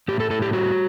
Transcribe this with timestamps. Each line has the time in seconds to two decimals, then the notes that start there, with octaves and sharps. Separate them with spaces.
0.08 A2 G4
0.20 A4
0.30 A2 A4
0.42 G4
0.53 G3 F#4